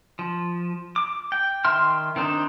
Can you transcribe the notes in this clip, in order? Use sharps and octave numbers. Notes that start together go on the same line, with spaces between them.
F3
D6
G5
D#3 E5 G5 C6 F6
D#3 C4 D4 D#4 C5